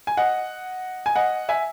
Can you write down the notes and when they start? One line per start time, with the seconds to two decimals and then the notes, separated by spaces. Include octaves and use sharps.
0.07 G#5
0.17 D#5 F#5
1.06 G#5
1.16 D#5 F#5
1.49 E5 G#5